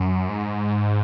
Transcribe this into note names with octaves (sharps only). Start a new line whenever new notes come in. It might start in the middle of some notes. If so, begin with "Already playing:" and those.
Already playing: F#2
G#2